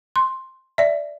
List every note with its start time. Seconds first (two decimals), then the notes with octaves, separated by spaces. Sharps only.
0.16 C6
0.78 D5 E5